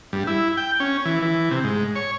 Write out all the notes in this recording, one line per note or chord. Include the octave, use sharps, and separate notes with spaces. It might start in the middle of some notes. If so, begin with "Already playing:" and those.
G2
E4
G5
C#4
E3
E3
C3
G#2
C#5